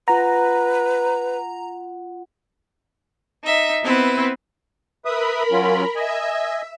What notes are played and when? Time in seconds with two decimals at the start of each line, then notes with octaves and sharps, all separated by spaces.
0.08 F4 B4 F#5 A#5
3.42 D#4 E5
3.84 B3 C4 E4 B4
5.05 A#4 B4 E5 B5 D#6
5.51 F#3 C#4 F4
5.95 D#5 E5 G#5